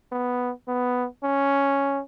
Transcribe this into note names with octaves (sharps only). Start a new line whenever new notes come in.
B3
B3
C#4